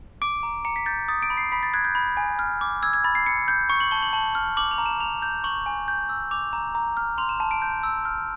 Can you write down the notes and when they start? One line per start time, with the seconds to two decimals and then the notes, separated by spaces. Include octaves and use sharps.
0.22 D6 D7
0.43 A#5
0.65 A#5 C#7
0.76 B6
0.86 G6 A6
1.08 D#6 A6
1.22 D7
1.30 B5
1.37 C7
1.52 B5 B6
1.63 A6
1.74 F#6 G#6
1.85 G6
1.95 B5
2.17 G#5
2.39 F6
2.61 D6
2.83 E6 G#6
2.93 G#6
3.04 B5 A6
3.15 C7
3.26 B5 C#7
3.48 G6
3.69 C#6 C#7
3.80 F#7
3.91 A5 G7
4.03 F#7
4.13 A5 F#7
4.35 F6
4.57 D6 F#7
4.71 F7
4.78 A#5
4.86 E7
5.00 A#5 F7
5.22 G6
5.44 C#6 F#7
5.66 G#5
5.88 G6
6.09 E6
6.31 D6 F7
6.53 A#5
6.75 A#5
6.97 F6
7.18 C6 F7
7.29 E7
7.40 A5
7.51 D7
7.62 G6
7.83 E6
8.05 F6